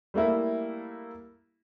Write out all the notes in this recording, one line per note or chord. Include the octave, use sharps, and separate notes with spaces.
G3 A3 A#3 E4